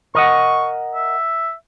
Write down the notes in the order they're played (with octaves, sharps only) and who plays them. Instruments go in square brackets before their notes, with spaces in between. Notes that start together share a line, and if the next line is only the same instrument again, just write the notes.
[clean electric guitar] A#4 D#5 F#5 [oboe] C#6
[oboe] E5